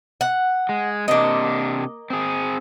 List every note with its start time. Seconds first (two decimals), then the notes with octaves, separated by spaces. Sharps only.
0.21 F#5
0.69 G#3
1.08 C3 A#3 D4 D#5
2.10 C4 G#4